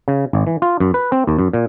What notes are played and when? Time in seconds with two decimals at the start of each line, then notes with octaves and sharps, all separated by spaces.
0.08 C#3
0.33 G#1
0.47 E3
0.62 F4
0.80 F#2
0.94 B4
1.12 C4
1.27 D#2
1.39 F#2
1.53 A#2